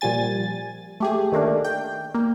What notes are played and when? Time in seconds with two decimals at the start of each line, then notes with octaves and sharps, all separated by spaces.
0.01 A#2 F3 G3 G#5 A6
1.00 A3 G4 G#4
1.32 D#3 A3 A#3 D4
1.64 G5
2.15 A#3